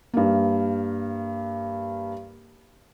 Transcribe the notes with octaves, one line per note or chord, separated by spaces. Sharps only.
G2 A#3